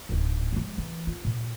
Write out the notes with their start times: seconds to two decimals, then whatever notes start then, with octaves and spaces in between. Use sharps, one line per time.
0.09 D1 G#2
0.53 F3 G#3
0.78 E3
1.07 F4
1.25 A#2